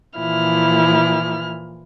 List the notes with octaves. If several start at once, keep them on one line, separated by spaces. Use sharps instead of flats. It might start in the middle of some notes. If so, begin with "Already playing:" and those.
A#2 E3 F3 E4 F6